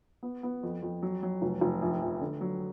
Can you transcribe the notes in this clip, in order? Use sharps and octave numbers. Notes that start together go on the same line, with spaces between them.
B3
B3
F2
F2
F#3
F#3
F1
F1
A#1
A#1
D3
F#3